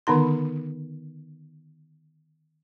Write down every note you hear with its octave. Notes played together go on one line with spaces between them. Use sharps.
D3 D#3 B3 D#4 C6